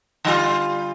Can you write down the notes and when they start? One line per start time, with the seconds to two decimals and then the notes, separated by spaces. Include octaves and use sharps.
0.25 D3 G3 F4